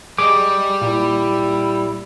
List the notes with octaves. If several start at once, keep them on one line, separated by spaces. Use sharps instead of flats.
G3 G#4 D#5 D6
A#2 E4